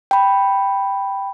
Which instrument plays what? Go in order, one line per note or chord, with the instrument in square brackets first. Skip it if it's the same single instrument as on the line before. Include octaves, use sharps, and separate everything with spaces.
[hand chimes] G5 B5